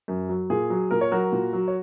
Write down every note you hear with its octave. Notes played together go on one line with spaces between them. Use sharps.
F#2
F#3
A#2 G#4
F#3
A#2 A#4
C#5
F#3 F#4 A#4
A#2
F#3
C#5